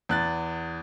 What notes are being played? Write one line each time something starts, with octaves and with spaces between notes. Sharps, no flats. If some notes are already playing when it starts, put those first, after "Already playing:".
E2 F#6 A6